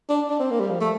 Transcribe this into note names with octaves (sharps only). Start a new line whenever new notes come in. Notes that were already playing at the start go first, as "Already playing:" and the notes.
D4
D4
C4
A#3
G3
F3
A3